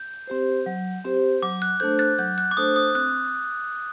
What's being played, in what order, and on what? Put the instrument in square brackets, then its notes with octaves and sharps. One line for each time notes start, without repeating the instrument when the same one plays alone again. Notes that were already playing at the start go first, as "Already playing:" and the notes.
Already playing: [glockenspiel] G6
[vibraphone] C4 G4 C5
F#3
C4 G4 C5
[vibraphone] F#3 [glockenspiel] D6
[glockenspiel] F#6
[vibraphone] A3 D4 A4 C5 [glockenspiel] G6
[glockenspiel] F#6 A6
[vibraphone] F#3 [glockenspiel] G6
[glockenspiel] F#6
D6
[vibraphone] A3 D4 A4 C5 [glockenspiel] D#6
[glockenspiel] D#6
[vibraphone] C4 [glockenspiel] F#6